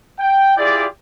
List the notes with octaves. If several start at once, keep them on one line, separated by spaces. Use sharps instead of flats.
G5
E4 F4 G4 G#4 D5